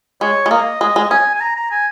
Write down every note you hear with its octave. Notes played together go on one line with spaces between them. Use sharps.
G#3 C#5
G#3
A#3 D#5
G#3 D#5
G#3
C#4 G#5
G#5
A#5
A#5
G#5